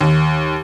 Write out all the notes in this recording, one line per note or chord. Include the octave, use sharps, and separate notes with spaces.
D#2